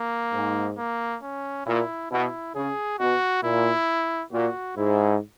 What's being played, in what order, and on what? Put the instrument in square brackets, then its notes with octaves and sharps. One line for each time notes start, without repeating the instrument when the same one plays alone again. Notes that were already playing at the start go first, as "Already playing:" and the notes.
Already playing: [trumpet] A#3
[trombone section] G#2
[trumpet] A#3
C#4
[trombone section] A#2 [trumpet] E4
[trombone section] B2 [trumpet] E4
[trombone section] C#3 [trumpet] G#4
[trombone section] B2 [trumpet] F#4
[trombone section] A#2 [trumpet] E4
[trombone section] A#2 [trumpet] F#4
[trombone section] G#2 [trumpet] E4